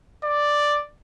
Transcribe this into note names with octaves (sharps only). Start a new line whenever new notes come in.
D5